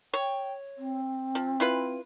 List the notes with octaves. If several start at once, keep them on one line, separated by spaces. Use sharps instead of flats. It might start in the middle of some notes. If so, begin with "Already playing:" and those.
C#5 G5
C4
F3
E4 F4 B4